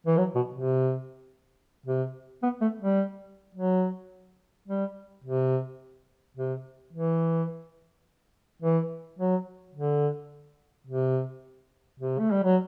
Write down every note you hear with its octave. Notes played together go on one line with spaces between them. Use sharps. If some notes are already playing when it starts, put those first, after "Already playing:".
E3
F#3
B2
C3
C3
B3
A3
G3
F#3
G3
C3
C3
E3
E3
F#3
D3
C3
C3
A3
G3
F#3